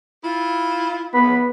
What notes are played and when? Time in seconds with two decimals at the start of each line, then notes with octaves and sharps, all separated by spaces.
0.23 E4 F4
1.14 B3 B5